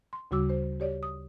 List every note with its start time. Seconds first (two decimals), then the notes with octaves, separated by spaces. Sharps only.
0.13 C6
0.31 D2 C#3 G3 F#4 D6 E6
0.50 C5
0.80 G4 C#5 D5
1.03 D#6